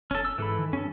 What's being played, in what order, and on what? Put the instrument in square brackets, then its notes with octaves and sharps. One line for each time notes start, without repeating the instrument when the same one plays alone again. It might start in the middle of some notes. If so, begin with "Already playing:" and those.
[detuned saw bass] F1 [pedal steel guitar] C#4 A4
[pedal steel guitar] E6
[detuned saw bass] G#2 [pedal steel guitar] E3 A4 B5
[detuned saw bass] D#3
[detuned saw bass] G2 [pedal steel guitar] C#4 A4